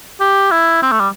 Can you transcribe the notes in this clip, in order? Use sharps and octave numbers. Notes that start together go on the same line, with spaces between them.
G4
E4
C4
A3
G3